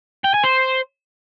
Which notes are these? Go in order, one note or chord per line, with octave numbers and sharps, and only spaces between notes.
G5
G#5
C5